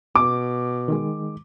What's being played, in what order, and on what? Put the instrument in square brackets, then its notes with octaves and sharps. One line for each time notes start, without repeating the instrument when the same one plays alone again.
[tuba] B2 [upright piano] D6
[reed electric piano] D#3 G#3